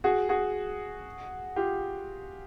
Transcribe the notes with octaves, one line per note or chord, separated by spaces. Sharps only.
F#4 G#4
F#4 G#4
F4 G4